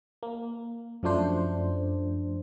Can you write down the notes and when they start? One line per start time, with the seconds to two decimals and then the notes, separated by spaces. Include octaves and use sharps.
0.23 A#3
1.03 F#2 F3 A3 D4 C5